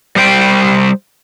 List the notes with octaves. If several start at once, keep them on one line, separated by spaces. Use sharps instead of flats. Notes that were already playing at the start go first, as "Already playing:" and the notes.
G3 C5 G5